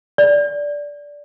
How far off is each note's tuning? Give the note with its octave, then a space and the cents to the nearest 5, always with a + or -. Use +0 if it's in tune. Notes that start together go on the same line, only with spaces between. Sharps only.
D5 -10